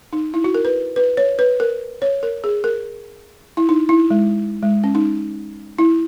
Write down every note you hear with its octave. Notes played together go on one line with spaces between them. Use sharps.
D#4
E4
F#4
A#4
B4
B4
C#5
B4
A#4
C#5
A#4
G#4
A#4
E4
D#4
E4
G#3
G#3
C#4
D#4
E4